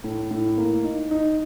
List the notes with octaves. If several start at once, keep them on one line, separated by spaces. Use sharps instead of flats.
A2
A2
A#3
D#4
D#4